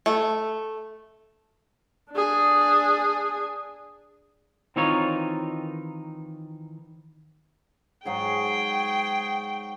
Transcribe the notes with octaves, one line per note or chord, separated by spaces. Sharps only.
A3
D4 G#4
D#3 E3 C4 D#4 F4 C#5
G#2 F#3 G#4 F#5 G5